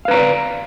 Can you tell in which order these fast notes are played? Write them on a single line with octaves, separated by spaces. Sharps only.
F5 B4 A#5 C#5 D5